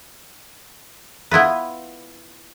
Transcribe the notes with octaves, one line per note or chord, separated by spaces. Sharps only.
B3 E4 F4 B4